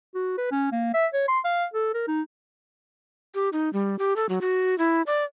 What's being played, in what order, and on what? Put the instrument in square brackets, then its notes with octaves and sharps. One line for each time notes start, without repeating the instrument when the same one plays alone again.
[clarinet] F#4
B4
C#4
A#3
E5
C#5
C6
F5
A4
A#4
D#4
[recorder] G4
D#4
G3
G4
A4
F#3
F#4
E4
D5